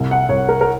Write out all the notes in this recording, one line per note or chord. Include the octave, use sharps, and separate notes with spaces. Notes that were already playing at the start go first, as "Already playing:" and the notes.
Already playing: C2
F#5
C2 C#5
A#4
A#4